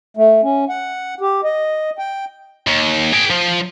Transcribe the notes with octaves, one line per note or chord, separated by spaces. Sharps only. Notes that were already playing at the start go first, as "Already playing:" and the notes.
A3
C#4
F#5
G4
D#5
G5
D#2
G#4 G5
F3